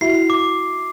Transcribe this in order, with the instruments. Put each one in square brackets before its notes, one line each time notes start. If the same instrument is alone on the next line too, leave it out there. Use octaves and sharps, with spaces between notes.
[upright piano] E4 F#4 [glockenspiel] C7
[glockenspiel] D6